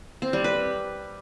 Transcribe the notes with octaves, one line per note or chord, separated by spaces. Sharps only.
C4
G3
B4